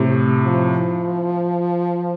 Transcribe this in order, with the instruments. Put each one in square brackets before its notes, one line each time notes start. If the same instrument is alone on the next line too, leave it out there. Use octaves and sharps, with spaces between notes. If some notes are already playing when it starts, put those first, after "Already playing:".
Already playing: [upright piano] A2 C3
[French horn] F3